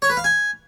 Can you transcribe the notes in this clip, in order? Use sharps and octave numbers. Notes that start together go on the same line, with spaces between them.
C#5
B4
F5
G#5